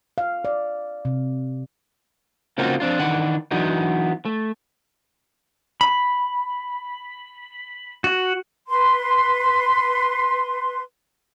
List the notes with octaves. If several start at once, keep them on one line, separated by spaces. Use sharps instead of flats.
F5
D5
C3
C#3 A#3 C4 D#4 F4 F#4
F3 C4 D4 F4
D#3 E3 D4 F#5
E3 F#3 B3 D4 D#4
A3
B5
F#4
B4 C6